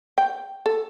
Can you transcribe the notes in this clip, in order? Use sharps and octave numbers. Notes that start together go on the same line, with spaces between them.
G5
A4